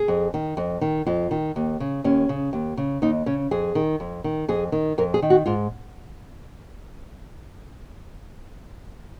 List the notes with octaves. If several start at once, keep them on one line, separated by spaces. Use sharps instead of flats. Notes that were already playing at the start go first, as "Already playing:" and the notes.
Already playing: G#4
F2
D#3
F2
D#3
F2 F4
D#3
D#2
C#3
D#2 C#4
C#3
D#2
C#3
D#2 D#4
C#3 C#4
F2 G#4
D#3
F2
D#3
F2 G#4
D#3
F2 A#4
G#4
D#3
F#4
G#2 F4